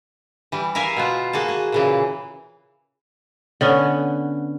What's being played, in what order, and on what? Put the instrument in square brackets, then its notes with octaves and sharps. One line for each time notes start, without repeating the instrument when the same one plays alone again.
[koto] E3 G3
A#4 E5 F5 G#5
B2 B3 F4
A#3 F#4 G#4 A5
G#4
A#2 C#3 E3
[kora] D3 B3 C#4